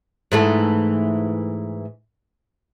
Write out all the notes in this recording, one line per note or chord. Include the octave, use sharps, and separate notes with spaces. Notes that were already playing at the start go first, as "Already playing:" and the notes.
G#2 E3 A3